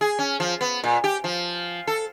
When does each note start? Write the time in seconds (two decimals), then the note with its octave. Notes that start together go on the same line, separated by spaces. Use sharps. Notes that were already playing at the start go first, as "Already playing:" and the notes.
0.01 G#4
0.19 C#4
0.40 F3
0.61 B3
0.84 A#2
1.04 G4
1.24 F3
1.87 A4